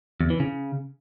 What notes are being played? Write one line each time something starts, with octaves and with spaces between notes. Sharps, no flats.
E2
E3
C#3